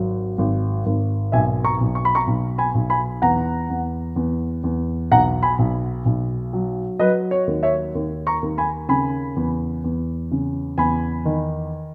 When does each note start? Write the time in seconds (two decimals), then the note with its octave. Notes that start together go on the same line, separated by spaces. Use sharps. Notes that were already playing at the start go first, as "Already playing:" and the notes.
Already playing: G#1 F#3
0.38 G#1
0.86 G#1
1.32 B1 E5 G#5
1.64 A#5 C#6
1.81 B1
1.95 C#6
2.05 B5
2.15 A#5 C#6
2.27 B1
2.58 G#5 B5
2.75 B1
2.90 G#5 B5
3.22 E2 F#5 A#5
3.70 E2
4.16 E2
4.64 E2
5.11 B1 F#5 A#5
5.43 G#5 B5
5.59 B1
6.06 B1
6.53 F#3
6.99 F#3 B4 D#5
7.31 C#5
7.47 D#2
7.63 C#5 E5
7.95 D#2
8.27 A#5 C#6
8.42 D#2
8.58 G#5 B5
8.89 C#3 G#5 B5
9.36 E2
9.84 E2
10.31 C#3
10.78 E2 G#5 B5
11.25 D#3